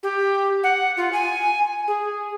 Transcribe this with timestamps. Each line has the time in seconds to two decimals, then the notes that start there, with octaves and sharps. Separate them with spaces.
0.03 G4
0.63 F#5
0.97 F4
1.13 G#5
1.88 G#4